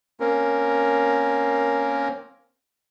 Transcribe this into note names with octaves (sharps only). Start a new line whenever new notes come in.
A#3 C4 C#4 A#4